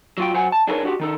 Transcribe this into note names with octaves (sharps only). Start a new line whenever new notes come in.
F#3 F4 G5
F#3 C5 F#5 G#5
A5
D4 D#4 G#4 A#4 B4 C#5
D4 F#4 G4
D#3 D#4 A4